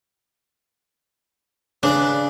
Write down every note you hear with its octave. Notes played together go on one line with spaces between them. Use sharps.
C#3 D4 B4 D5